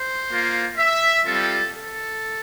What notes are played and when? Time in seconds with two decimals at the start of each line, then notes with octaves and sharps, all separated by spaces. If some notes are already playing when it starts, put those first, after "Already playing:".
Already playing: C5
0.31 A#3 F4
0.78 E5
1.26 G3 C4 F4 A4
1.74 A4